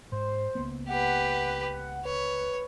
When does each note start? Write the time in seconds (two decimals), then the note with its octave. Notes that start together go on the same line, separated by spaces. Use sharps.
0.12 G#2 C5
0.55 C#2 A#3 B3
0.89 G4 B4 F#5
1.73 F#5
2.05 B4 C#5